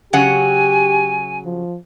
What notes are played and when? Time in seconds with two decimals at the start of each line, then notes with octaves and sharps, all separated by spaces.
0.13 C#3 F#3 G4 F#5 G#5
1.45 F3